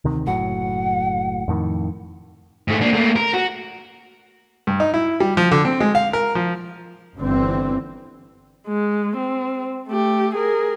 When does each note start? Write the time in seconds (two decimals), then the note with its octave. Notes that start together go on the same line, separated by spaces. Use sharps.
0.05 D2 C3 D#3
0.27 F#1 A2 F#3 F#5
1.48 F2 A2 D#3
2.68 G#2 A3
2.81 A#3 D4
2.93 A3 A#3
3.16 A#4
3.34 F#4
4.67 G2
4.80 D#4
4.94 E4
5.20 G3
5.37 F3
5.51 D3
5.65 C4
5.80 G#3
5.95 F5
6.13 A#4
6.35 F3
7.18 G1 D3 E3 C4
8.68 G#3
9.16 C4
9.88 A3 G4
10.35 G#4 A#4